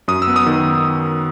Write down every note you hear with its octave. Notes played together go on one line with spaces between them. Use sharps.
F#2 D#6
E6
B3
D#6
D#3